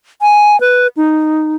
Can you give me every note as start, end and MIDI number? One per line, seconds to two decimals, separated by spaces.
0.22 0.59 80
0.61 0.87 71
0.97 1.56 63